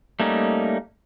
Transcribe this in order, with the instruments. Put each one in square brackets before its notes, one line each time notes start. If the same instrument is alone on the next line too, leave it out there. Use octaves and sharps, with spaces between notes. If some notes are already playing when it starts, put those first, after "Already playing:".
[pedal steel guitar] G3 A3 A#3 C#4 D#4